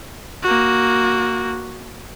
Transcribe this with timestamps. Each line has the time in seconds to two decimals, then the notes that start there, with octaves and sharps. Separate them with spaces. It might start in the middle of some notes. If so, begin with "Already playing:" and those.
0.43 A#3 F#4